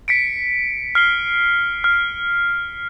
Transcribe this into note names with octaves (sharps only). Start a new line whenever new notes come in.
B6 C#7 D7
F6 C7 G7
F6